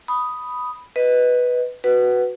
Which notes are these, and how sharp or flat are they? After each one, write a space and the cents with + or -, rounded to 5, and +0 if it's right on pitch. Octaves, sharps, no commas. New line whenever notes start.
B5 +0 D#6 +0
B4 +0 D#5 +0
F#4 +0 B4 +0 F#5 +20